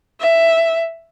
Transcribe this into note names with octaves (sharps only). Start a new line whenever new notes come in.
E5